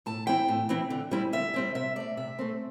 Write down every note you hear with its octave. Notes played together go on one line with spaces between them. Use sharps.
A2 A5
E3 C4 E4 G5
A2
E3 C4 E4
D3
G3 C4 E4
D3 E5
G3 C4 E4
C3 E5
A3 C4 D5
C3 E5
A3 C4